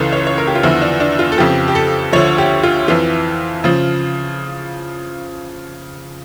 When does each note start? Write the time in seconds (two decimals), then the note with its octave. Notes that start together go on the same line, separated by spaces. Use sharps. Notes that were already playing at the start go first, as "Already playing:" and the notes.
Already playing: C#2 C#3 E3 A4
0.13 C#5
0.27 C#5
0.38 A#4
0.47 G4
0.55 F4
0.63 E2 D3 F3 E4
0.82 D4
1.00 D4
1.19 F4
1.32 A4
1.38 F2 C#3 F3 G4
1.68 G4
1.75 A4
2.13 D2 D3 F3 C#5
2.38 G4
2.63 F4
2.88 F2 E3 F4
3.64 C#3 F3